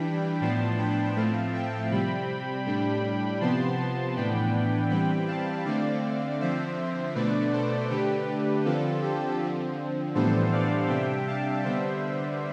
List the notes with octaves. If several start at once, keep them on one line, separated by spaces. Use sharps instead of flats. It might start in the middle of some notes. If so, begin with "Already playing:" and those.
Already playing: E3 G3 D4 G5 B5
A2 F3 B3 D4 A5 C6
G5 B5
A2 F3 A3 C4 F5 A5
E5 G5
C3 G3 C4 G5 B5
A2 G3 D4
C3 F3 B3 A5 C6
A2 E3 B3 D4 G5 B5
E3 G3 C4 G5 B5
F5 A5
D3 A3 C4 D5 F5
D3 F3 C4 C5 E5
B2 A3 D4 B4 D5
A4 C5
D3 A3 D4 G4 B4
D3 F3 C4 F4 A4
G4
D3 F3 C4
A2 E3 G3 B3 D4 A4 C5
D5 F5
C3 G3 D4 E5 G5
F5 A5
D3 G3 B3 D4 C5 E5